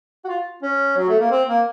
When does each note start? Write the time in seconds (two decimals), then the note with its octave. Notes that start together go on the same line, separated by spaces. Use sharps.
0.25 F#4
0.29 F4
0.63 C#4
0.98 F#3
1.09 A3
1.20 A#3
1.31 C4
1.49 A#3